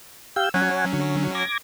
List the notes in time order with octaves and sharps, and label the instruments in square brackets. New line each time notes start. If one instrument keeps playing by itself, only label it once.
[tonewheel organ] G4 F5 G6 [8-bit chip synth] E6
[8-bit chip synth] F#3 C#4 [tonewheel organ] C#5 F#5 G#5
[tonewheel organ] D3
D6 G#6 A#6